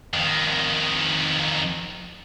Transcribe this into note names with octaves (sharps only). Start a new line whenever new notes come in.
F2 D#3